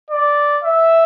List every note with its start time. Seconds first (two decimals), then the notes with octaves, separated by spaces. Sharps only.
0.10 D5
0.63 E5